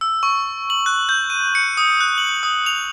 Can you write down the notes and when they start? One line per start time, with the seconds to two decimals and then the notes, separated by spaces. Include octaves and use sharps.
0.01 E6
0.23 C#6
0.70 F#7
0.86 F#6
1.09 G6
1.30 D#7
1.55 C#7
1.77 D#6
2.01 F#6
2.18 F#7
2.43 D#6
2.66 F7